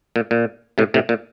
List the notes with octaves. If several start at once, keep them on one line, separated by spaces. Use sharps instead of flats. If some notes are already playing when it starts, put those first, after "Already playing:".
A#2
A#2
A2 C3
A2 C3
A#2